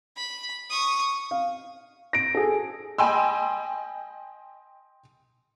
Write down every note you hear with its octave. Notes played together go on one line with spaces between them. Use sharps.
B5
C#6 D#6
F5
A#6 D7
G#4 A4
D#5 G5 G#5 B5 C6 E6